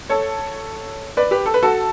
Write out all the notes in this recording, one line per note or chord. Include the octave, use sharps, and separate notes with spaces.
A4 C#5
B4 D5
G4 B4
A4
B4
F#4 A4